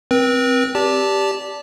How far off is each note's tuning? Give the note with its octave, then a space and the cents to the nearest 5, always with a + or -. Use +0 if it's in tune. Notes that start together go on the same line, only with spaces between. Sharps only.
C4 +0 B4 -40
G4 +0 D5 -20 A5 +0